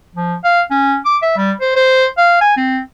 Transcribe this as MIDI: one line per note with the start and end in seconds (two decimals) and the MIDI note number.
0.15 0.36 53
0.44 0.62 77
0.71 0.97 61
1.05 1.17 86
1.22 1.37 76
1.37 1.52 55
1.61 1.75 72
1.76 2.06 72
2.18 2.39 77
2.41 2.53 80
2.57 2.79 60